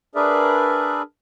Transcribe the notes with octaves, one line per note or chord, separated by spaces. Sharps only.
D4 G#4 A#4 B4 D5 E5